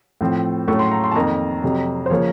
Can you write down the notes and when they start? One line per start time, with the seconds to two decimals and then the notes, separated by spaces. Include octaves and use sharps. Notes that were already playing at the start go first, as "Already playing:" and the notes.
0.21 A2 F3 C4
0.68 A2 F#3 A3 C#4 C#6
0.79 C6
0.91 A#5
1.04 C6
1.11 A5
1.15 F2 D#3 A#3 A#5
1.63 F2 C3 F#3
2.06 C5
2.10 C#3 F3 A#3 C#4 C#5